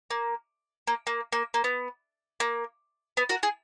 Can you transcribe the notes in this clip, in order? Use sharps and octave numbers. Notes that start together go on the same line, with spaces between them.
A#3
A#3
A#3
A#3
A#3
B3
A#3
B3
F#4 A#4
G#4